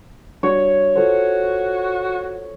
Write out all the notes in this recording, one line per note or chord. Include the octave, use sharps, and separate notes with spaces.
G3 D4 F#4 C#5
F4 F#4 A4 C5